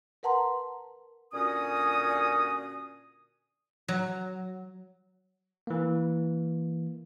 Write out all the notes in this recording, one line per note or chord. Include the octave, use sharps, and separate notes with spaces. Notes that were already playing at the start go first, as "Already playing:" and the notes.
A#4 B4 F#5 A5 A#5 C6
A#2 D3 C#4 F#4 G#5 D#6
F#3
E3 A#3